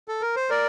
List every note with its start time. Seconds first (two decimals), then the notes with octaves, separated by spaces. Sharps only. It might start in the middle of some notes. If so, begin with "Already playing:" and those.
0.08 A4
0.22 A#4
0.36 C5
0.50 A#4 D5